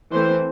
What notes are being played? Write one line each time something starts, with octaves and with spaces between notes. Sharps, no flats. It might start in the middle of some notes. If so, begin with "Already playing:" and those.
E3 A3 C4 C5